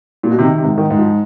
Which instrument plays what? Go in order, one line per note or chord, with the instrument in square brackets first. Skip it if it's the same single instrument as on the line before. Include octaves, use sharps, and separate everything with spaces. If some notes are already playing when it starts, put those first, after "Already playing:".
[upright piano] A#2
B2
[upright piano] C3 [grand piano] D#3
[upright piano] C3
[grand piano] G#2
[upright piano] D#3
[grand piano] G#2
[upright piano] F3